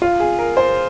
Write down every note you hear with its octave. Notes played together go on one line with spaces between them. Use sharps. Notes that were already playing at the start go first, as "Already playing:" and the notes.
F4
G#4
A#4
C5